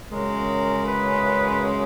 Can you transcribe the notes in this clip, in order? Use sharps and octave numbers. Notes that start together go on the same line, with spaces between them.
F#2 C#3 G#3 A#4
B4